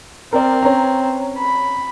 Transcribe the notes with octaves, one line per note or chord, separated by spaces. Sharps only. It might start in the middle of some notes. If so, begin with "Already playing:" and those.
C4 A#4 D5
C#4 B4 A#5
B5